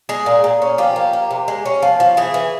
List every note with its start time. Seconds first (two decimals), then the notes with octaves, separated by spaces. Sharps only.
0.09 G#3 G#4
0.26 A#2
0.44 A#2
0.62 C#4
0.78 F3 G4
0.96 A#3
1.13 A#3
1.30 C3
1.48 G#3
1.66 C#4
1.83 F3
2.00 F3
2.17 E3 G#4
2.34 E3